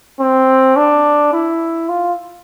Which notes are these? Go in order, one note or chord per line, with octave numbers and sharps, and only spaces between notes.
C4
D4
E4
F4